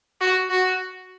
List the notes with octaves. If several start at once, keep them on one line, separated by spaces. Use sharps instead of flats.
F#4
F#4